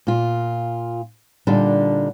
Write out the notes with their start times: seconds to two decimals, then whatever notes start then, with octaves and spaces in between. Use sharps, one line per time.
0.07 A#2 F4
1.47 A#2 D3 G3 D4 D#4